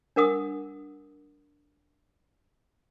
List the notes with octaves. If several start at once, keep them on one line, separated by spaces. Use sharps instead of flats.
D4 A#4 F#5 D#6